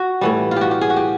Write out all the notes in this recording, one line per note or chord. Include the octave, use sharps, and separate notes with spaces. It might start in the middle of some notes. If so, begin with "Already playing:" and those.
Already playing: F#4
A2 E3 G3
F4
F#4 G4
G4
G#4
F#4
G4